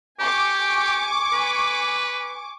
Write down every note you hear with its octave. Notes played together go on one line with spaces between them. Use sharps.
G4 G#5 C#6 D6
B4